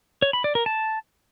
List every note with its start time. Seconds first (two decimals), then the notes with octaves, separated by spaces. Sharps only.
0.22 C#5
0.33 B5
0.44 D5
0.55 A#4
0.66 A5